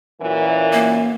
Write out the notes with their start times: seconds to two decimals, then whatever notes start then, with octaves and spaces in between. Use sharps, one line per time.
0.22 F#2 A#2 E3
0.73 A#3